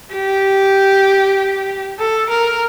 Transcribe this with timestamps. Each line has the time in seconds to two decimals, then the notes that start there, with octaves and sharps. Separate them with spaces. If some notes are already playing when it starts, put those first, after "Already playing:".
0.13 G4
1.99 A4
2.30 A#4